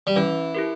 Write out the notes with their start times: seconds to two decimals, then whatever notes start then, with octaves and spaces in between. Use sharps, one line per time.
0.07 G3
0.16 E3 C#4
0.55 E4 G4 A#4